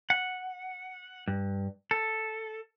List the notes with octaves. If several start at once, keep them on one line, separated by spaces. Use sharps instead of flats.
F#5
G2
A4